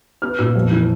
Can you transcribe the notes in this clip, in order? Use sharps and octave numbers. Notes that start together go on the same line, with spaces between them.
B3 F6
A#2 E6
F2
E3